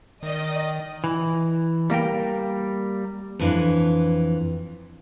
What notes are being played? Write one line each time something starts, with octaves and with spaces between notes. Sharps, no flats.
D#3 D5 D#5
E3
G3 A#3 A#4 G5
F2 E3 D4